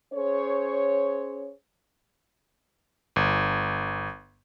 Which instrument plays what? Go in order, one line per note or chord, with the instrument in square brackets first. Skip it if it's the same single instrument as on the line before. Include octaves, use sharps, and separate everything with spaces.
[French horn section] C#4 G#4 C5 C#5
[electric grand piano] G1